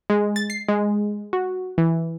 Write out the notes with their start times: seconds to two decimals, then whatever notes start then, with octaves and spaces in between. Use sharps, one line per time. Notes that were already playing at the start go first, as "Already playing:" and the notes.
0.10 G#3
0.36 A6
0.50 C7
0.68 G#3
1.33 F#4
1.78 E3